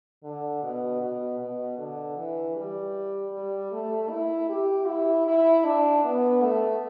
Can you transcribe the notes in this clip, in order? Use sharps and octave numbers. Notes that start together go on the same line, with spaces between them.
D3
B2
B2
B2
D3
E3
G3
G3
A3
E4
G4
E4
E4
D4
B3
A3